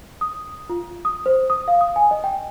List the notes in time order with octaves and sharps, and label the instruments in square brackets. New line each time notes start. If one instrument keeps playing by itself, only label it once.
[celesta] D#6
F4
D#6
C5
D#6
F5
D#6
G#5
D#5
G5